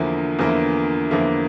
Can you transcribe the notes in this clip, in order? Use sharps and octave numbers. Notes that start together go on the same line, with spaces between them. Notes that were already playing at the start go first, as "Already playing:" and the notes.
Already playing: E2 D3 F3 A#3 E4
E2 D3 F3 A#3 E4
E2 D3 F3 A#3 E4